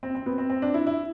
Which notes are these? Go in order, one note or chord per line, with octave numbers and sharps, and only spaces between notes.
C4
C4
B3
C4
C4
D4
E4
E4